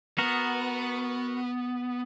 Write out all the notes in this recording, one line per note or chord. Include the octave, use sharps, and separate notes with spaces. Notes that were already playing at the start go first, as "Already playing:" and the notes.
B3 F#4 A#4